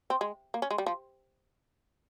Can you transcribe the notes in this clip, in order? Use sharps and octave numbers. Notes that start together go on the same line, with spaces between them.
C4
G#3
A#3
C#4
G#3
G3
F3